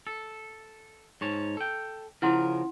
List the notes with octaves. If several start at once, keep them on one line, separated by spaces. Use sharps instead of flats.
A4
G#2 C#5 A5
A4 G5
C#3 F3 E4 A#4 F#5 C6